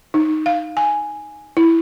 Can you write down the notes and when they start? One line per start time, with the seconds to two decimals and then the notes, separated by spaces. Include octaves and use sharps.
0.14 D#4
0.46 F5
0.77 G#5
1.57 E4